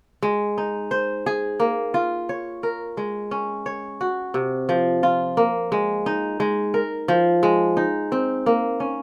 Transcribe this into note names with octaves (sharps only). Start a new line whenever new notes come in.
G#3
D#4
C5
G#4
A#3
F4
C#5
A#4
G#3
C#4
C#5
F#4
C3
F3
F4
A#3
G#3
D#4
G#3
A#4
F3
G#3
D#4
C4
A#3
C#4